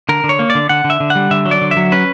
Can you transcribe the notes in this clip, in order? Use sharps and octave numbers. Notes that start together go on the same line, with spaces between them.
D3 A#4
D3
C#5
A#3
D5
D3
D3 F#5
D3
E5
D3
F#5
G3
D3 E5
F#3
D5
D3
E5
F#3
C#4 B4